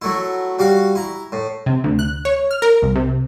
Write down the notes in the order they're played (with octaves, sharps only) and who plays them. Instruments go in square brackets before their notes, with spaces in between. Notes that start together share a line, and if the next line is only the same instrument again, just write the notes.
[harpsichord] F#3 A3 E4
G3 F#4 F5
E4 A#5
A2
[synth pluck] C3
D2
F#6
C#5
F6
A#4
C2
C3